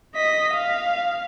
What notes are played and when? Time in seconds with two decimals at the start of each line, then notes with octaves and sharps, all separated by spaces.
0.15 D#5 B6
0.54 F5